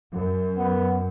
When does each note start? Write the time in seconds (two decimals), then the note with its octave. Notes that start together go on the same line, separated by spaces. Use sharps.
0.12 F#2
0.57 B3